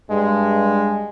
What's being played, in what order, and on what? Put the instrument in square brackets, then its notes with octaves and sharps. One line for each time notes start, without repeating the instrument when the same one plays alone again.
[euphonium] G2 [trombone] G#3